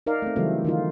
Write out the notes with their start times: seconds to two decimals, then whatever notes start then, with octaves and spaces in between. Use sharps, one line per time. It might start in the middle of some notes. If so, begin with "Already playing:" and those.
0.06 D#4 A#4 D5 F5
0.22 A3 C4
0.36 C#3 E3 F#3 G3 A3 C4
0.65 D#3 D#4 F4